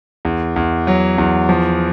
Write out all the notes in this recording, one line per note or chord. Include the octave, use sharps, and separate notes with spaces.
E2
E2
F#3
E2
F3